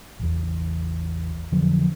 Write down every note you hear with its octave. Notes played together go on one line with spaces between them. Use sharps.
A1 E2
F2 D3 F3 F#3